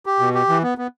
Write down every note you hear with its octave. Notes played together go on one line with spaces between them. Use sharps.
G4
B2
G4
E3
B3
B3